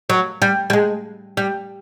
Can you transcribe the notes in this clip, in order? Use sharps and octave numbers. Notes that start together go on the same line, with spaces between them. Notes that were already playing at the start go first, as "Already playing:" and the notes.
F#3
G3
G3
G#3
G3